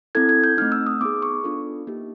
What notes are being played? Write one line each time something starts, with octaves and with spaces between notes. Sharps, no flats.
C4 E4 A4 G#6
G#6
G6
A3 C4 D#4 F6
E6
D#6
B3 D#4 G#4 D6
C#6
B3 D4 F4 A4
A#3 D#4 G4